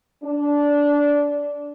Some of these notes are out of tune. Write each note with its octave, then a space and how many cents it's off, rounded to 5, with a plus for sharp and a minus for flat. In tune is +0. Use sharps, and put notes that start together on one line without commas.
D4 -15